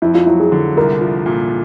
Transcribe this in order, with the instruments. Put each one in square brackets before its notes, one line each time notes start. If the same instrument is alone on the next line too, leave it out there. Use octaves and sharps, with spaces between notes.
[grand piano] F2 [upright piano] E4
[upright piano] F4
[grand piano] F#3 [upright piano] E4
[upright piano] G#4
[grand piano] D3
[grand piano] C2 [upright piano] A#4
[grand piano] F3
A#2